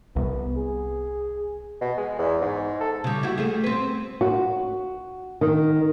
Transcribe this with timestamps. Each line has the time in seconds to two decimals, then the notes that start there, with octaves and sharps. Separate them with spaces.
0.16 C2 B3
0.57 G#4
1.81 B2
1.98 G#3
2.19 E2
2.42 G#2
2.81 A4
3.04 C#3 G3
3.23 E4 F#4
3.38 G3 A3 G#4
3.64 C4 B4
4.21 F#4
5.41 D#3